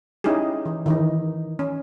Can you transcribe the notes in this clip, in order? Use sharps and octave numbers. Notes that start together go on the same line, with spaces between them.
C#4 D#4 E4 G4 G#4
E3
D#3 E3 D#4
C#4